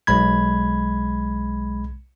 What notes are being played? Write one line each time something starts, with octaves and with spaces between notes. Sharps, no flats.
B1 G#3 B5 G#6